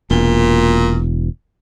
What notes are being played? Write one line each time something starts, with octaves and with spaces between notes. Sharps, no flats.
E1 A#2